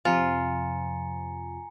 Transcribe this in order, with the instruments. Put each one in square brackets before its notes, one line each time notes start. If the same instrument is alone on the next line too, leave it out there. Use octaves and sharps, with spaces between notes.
[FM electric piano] F2 C3 F3 [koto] F4 [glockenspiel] G#5 A#5 C#7